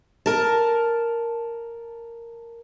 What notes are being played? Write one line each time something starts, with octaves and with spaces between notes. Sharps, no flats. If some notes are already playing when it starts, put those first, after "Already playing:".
A#4 A5